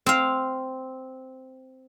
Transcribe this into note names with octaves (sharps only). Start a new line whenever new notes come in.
C4 F5